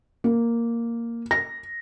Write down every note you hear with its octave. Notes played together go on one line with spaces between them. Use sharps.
A#3
A#6